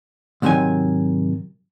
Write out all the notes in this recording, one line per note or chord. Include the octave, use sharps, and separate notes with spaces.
D2 G#2 C3 D#3 F#3 G#5